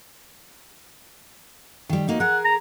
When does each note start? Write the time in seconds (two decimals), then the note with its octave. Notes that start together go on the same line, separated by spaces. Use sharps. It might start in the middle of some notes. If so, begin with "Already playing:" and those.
1.89 D#3 G3
2.08 A#3 D#4 F#4
2.20 G#4 A#4 F#5
2.45 A#5